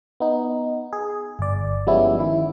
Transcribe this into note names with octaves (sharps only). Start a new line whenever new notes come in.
B3 D#4
G#4
G1 D5
F3 G3 G#3 B3 C#4 E4
D#3 E4